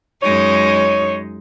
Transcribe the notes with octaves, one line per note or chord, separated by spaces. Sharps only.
F#2 G#3 D#4 C#5